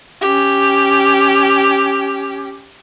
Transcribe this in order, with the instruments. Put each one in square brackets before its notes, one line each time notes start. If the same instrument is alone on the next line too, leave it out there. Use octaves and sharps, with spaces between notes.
[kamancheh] C#4 G4